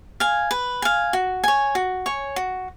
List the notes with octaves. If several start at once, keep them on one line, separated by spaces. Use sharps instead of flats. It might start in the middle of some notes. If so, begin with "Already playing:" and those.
F5 G#5
B4
F5 G#5
F#4
C#5 G#5
F#4
C#5 G#5
F#4